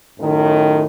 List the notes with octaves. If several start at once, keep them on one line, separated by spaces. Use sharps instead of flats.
F#2 A2 D#3